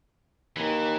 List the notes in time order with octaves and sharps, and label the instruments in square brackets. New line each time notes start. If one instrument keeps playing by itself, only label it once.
[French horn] D#2 [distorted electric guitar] E3